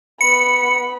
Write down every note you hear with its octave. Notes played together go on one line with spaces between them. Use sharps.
B3 B5 C#7